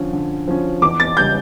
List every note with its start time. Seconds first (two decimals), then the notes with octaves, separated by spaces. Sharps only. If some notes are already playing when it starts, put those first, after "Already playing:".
Already playing: D3 F3 C#4
0.13 D3
0.48 F3 C#4
0.82 E2 D6
1.00 A6
1.17 C#3 G3 G6